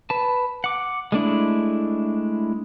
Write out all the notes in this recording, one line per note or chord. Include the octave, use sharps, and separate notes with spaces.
B4 A5
F#5 D6
G#3 A3 D4 E4